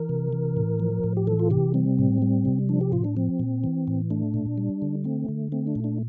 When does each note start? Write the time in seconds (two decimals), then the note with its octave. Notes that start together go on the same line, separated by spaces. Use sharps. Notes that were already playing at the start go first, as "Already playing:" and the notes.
Already playing: E3 A#4
0.09 C3
0.33 E3
0.57 A2
0.80 F3
1.04 A2
1.17 G4
1.27 E3 A4
1.39 F4
1.50 C3 G4
1.74 G3 C4
1.99 A2
2.22 G3
2.45 C3
2.69 F3 D4
2.81 G4
2.92 A2 F4
3.04 D4
3.16 F3 C4
3.39 A#2
3.64 E3
3.88 A2
4.10 A3 D4
4.34 A#2
4.58 G3
4.82 D3
5.04 A3 C4
5.29 D3
5.52 A3 C4
5.67 D4
5.75 A#2
5.84 D4